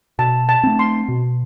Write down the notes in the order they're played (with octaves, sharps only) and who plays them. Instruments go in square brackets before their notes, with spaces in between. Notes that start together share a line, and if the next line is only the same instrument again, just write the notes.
[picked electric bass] B2 [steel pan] A5
[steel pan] A5
[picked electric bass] A3 C4
[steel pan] C6
[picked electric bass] B2